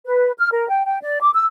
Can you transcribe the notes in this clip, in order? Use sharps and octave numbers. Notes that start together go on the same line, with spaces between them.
B4
F6
A#4
G5
G5
D5
D6
E6